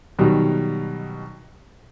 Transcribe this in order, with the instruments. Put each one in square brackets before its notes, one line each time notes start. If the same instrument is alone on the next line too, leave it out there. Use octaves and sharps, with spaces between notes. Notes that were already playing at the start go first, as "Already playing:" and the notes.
[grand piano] B2 D#3 F#3 G3